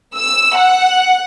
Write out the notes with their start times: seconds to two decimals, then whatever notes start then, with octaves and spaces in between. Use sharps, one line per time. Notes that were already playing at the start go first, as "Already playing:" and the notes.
0.16 E6
0.57 F#5